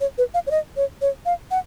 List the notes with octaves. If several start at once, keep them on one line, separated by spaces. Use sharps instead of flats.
C#5
B4
F5
C#5
D#5
C#5
C#5
F5
F#5